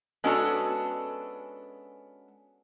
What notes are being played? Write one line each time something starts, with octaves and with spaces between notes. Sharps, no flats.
G#3 B3 C#4 D4 F#4 A4